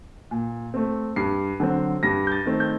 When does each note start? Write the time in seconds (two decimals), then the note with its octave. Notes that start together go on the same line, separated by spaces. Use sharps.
0.31 A#2
0.74 A3 C4
1.16 G2 C7
1.60 D3 F#3 C4
2.03 G2 A#6
2.27 G6
2.32 A6
2.46 D#3 A3 C4
2.60 G6